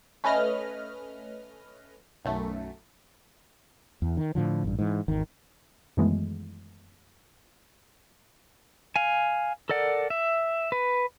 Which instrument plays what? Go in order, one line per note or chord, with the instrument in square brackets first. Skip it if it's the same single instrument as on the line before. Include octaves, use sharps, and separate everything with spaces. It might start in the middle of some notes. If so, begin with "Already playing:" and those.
[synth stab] A3 C#4 B4 D#5 F6 A#6
B1 F#2 A3
[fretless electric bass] E2
D#3
A2 D3 F3
A1 G2
G#2 E3
G#1 E2 D#3
[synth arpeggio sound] F#2 D#3 E3 G#3 A3 B3
[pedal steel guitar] F5 G#5
A4 A#4 D5 F#5
E5
B4